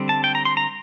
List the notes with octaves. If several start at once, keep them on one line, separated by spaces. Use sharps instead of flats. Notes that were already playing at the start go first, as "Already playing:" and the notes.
Already playing: D3 G3 C4
A5
G5
A#5
C6
A#5